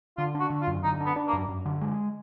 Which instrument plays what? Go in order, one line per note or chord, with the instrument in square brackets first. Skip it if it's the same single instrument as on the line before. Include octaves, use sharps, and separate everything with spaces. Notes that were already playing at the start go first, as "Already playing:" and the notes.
[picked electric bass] D3 [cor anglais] F4
[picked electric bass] D4
[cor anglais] F#4
[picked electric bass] D3
[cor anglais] F4
[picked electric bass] F#2
[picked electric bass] D3 [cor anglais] D#4
[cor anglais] B3 [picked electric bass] D4
[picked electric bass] D4
[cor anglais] A#3
[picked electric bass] F#2
F#2
D3
G#3